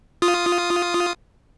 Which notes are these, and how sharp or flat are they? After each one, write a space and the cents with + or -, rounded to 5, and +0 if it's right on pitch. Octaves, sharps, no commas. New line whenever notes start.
F4 +0 D#6 +0